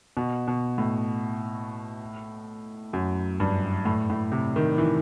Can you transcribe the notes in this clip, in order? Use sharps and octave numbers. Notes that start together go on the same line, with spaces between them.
B2
B2
A2
F#2
G2
A2
A2
C3
D#3
E3